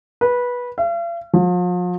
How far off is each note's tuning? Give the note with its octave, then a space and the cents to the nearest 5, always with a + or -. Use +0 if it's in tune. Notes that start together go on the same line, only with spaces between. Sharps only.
B4 -15
F5 -45
F3 +40